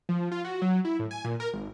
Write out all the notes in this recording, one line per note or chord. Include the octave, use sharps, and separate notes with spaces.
F3
F4
F#4
F#3
E4
A2
G#5
A#2
A#4
G#1